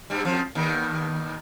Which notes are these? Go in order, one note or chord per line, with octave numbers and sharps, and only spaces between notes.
G2 G3
F2 F3
D#2 D#3